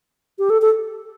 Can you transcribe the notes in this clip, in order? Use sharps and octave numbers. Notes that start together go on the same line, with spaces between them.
G4
A4
A4